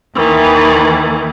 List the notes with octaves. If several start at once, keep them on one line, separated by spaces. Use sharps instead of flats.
D#2 D#3 E3